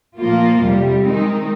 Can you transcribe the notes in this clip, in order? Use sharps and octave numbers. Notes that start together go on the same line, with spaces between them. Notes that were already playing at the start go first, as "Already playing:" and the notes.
A#2 F3 A#3 F4
F2 C3 G3
D#3 G#3 C4 D#4